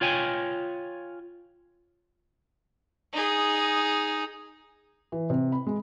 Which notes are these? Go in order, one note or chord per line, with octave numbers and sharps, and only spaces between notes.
F4 C#5 G5 G#5
D#4 G#4
E3
C3
B5
G#3